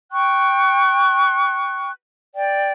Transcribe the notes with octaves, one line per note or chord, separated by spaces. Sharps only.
G5 C#6 F#6
D5 G5